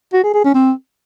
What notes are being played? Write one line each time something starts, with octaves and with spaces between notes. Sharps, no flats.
F#4
G#4
G#4
C#4
C4